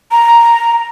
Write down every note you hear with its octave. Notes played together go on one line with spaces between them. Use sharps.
A#5